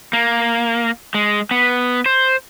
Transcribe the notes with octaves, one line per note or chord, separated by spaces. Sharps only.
A#3
G#3
B3
C5